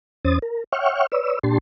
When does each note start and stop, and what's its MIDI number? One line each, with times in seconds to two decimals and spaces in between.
0.25 0.39 40
0.25 0.39 61
0.25 0.39 72
0.25 0.39 87
0.25 0.39 93
0.42 0.64 70
0.72 1.06 73
0.72 1.06 76
0.72 1.06 78
0.72 1.06 79
0.72 1.06 85
0.72 1.06 89
1.12 1.39 71
1.12 1.39 73
1.12 1.39 74
1.12 1.39 88
1.43 1.58 46
1.43 1.58 62
1.43 1.58 67
1.43 1.58 81
1.43 1.58 84